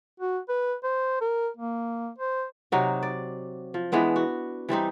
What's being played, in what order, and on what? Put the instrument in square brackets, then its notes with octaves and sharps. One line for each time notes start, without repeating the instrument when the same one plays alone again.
[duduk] F#4
B4
C5
A#4
A#3
C5
[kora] C3 F#3 D#4 F#4
D5
F3
E3 G#3 B3 D4
F#4
E3 G3 C4 D#4